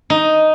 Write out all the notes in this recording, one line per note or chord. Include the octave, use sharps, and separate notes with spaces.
D#4